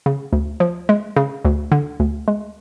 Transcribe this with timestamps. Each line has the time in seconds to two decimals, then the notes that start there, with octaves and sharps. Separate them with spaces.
0.06 C#3
0.33 D2
0.60 F3
0.89 G#3
1.16 C#3
1.45 D2
1.72 D3
2.00 D2
2.28 G#3